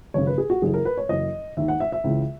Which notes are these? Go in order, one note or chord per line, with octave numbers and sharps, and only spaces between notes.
G#1 F#2 C#3 C#5
B4
G#4
F#4
F#1 F#2 E3 G#4
A#4
B4
C#5
F#1 F#2 E3 D#5
D#2 D#3 E5
F#5
E5
E5
C#2 C#3 E3